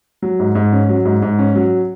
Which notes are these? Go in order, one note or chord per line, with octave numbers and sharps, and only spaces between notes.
F#3
G#2
G#2
C#4
F#3
G#2
G#2
C#4
F#3